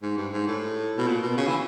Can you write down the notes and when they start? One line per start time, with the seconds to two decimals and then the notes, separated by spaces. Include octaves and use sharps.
0.02 G#2
0.17 G2
0.32 G#2
0.47 A2
0.98 B2
1.07 A#2
1.22 B2
1.37 C#3
1.47 E3